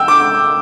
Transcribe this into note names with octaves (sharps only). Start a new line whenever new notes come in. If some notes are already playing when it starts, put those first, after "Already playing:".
Already playing: G5 E6
D6